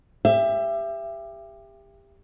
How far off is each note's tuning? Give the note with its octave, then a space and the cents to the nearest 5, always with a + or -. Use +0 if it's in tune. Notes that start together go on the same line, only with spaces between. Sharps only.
G4 +25 E5 +25